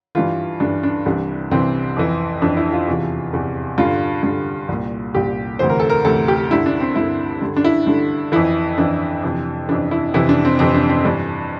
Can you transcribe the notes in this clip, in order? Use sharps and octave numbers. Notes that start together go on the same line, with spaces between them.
G2 E3 F4
G2 E3 D4
D4
C2 C3 E3 D4
C2 C3 E3 C4
F2 E3
F2 E3 D4
E4
F4
E2 C3 E3
E2 C3 E3
G2 D3 F4
G2 D3
C2 A#2
C2 A#2 G4
D2 C3 E3 C5
A#4
A4
A#4
D2 C3 E3 A4
G4
G2 D3 E4
D4
C4
G2 D3 E4
G2 D3
D4
E4
G2 D3
F2 E3 E4
F2 E3 D4
F2 C3 E3
F2 C3 E3 D4
E4
F2 C3 E3 E4
D4
C4
F2 C3 E3 C4
D4
C4
G2 E3 D4